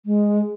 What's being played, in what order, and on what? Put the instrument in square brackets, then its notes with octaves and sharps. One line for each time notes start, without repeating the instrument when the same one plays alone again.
[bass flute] G#3